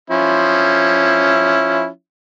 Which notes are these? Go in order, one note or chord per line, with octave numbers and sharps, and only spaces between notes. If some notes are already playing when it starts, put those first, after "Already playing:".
F3 C#4 E4